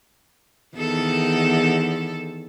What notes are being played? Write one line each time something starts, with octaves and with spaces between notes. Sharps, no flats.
E2 D#3 A4